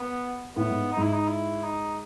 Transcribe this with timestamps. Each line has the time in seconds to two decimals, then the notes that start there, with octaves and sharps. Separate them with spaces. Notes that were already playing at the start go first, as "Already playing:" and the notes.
Already playing: B3
0.56 A2 B3
0.69 G#2
0.92 D#4
0.97 G#2
1.02 E4
1.13 D#4
1.28 E4
1.63 D#4